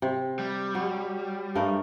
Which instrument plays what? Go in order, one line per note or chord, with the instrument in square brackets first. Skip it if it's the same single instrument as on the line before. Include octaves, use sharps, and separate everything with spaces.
[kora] C3
[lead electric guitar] G3
[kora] F#3
G2 A3 A#4